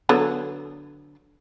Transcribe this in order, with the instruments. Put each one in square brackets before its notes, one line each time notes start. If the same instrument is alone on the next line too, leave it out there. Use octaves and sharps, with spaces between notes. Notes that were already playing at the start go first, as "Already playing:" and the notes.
[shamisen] D3 F#3 B3